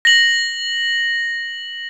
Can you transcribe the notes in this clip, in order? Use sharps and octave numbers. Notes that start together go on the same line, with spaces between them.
A#6 F#7